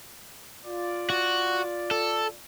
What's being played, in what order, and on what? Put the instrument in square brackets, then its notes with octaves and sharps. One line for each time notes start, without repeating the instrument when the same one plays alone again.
[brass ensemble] F4 D5
[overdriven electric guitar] F#4
A4